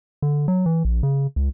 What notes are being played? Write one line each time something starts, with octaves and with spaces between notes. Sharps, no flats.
D3
F#3
E3
A#1
C#3
C#2